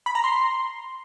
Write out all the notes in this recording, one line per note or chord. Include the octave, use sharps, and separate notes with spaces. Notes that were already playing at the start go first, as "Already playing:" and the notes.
B5
A#5
C6